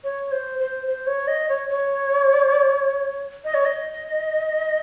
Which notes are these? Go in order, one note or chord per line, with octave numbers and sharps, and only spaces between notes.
C#5
C5
C5
C5
C#5
D#5
C#5
C#5
D#5
C#5
D#5